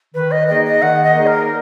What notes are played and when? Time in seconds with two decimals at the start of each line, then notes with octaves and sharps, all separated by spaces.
0.15 D#3 B4
0.31 D#5
0.48 A#3 D#4 G#4 D5 D#5
0.65 D#5
0.82 D#3 F#5
1.04 D#5
1.15 A#3 D#4 G#4 D5
1.27 A#4